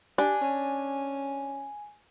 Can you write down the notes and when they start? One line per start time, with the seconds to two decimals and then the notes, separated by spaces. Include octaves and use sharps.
0.18 D4 G4 G#5
0.42 C#4